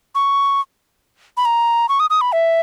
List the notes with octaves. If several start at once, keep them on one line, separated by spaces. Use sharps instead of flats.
C#6
B5
A#5
C#6
D#6
D#6
B5
E5